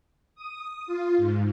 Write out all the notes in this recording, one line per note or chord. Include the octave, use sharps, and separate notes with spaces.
D#6
F4
G#2